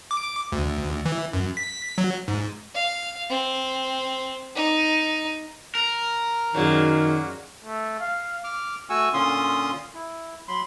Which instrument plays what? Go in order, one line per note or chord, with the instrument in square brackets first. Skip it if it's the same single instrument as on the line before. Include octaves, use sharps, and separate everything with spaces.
[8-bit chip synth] D6
D2
E3
F#2
B6
F#3
G#2
[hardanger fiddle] F5
C4
D#4
[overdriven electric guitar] A#4
[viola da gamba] F#2 G#4 [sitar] A#2 F#3 [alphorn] D#3
[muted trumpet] A3
F5
[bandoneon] D6 F6
A3 F#4 G#5 C#6 E6
A#2 D3 C#4 F4 C6 D#6
E4
F#3 B5 C6